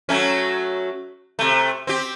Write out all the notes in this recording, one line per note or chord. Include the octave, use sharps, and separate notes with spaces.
F#3 A3 C#4
C3 A3
C4 G4